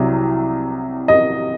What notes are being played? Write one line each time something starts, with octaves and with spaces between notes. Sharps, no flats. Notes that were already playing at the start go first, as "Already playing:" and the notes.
Already playing: C2 C3 F#3
D#5